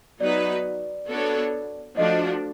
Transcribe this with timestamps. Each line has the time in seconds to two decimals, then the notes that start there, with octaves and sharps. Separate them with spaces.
0.20 F#3 B3 D#4 F#4 B4 D5
1.10 B3 D4 F#4 A4 C#5
1.97 F3 A3 D4 F#4 D#5